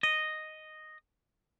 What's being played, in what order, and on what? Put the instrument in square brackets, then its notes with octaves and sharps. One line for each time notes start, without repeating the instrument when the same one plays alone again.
[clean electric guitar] D#5